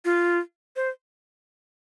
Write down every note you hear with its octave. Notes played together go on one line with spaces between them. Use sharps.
F4
C5